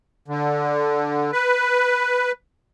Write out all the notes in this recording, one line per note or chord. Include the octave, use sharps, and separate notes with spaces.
D3
B4